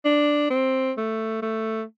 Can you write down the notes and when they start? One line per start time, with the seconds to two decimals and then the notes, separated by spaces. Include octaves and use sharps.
0.05 D4
0.50 C4
0.97 A3
1.42 A3